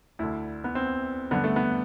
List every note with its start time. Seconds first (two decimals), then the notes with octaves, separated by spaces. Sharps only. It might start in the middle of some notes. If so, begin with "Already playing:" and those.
0.19 D2 D3 E4
0.64 B3
0.75 C4
1.31 G2 D3 B3
1.44 A3
1.56 B3